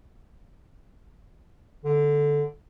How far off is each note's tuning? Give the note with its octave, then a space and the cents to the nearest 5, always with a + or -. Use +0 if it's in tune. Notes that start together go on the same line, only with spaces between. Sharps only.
D3 -5